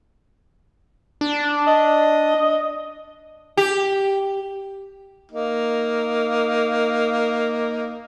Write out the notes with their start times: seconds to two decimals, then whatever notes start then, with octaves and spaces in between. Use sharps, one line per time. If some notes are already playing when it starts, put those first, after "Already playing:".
1.21 D4
1.67 D#5
3.57 G4
5.32 A#3 D#4